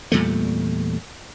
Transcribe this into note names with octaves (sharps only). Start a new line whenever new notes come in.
E2 A#2 G3 A3